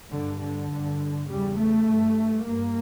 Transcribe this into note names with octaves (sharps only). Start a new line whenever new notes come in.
G2 D3
D3
G2
E2 C#3 G3
A3
G2
G2 A#3